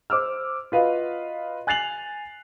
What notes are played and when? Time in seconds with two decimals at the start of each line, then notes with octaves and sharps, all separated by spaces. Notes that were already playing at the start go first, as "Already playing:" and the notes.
0.10 C5 D6 E6 F6
0.72 F4 F#4 B4 D#5 F5
1.67 G#5 F#6 A6 C7 F7 F#7